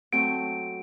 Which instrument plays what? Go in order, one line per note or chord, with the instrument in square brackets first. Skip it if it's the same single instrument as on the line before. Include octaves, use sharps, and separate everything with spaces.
[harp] F#3 A3 C4 [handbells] D7